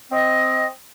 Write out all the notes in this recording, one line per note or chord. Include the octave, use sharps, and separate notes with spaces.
C4 D#5